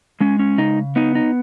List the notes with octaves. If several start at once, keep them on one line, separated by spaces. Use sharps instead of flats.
G#3 C#4
C#4
C#3 D#4
B3 D#4
D#4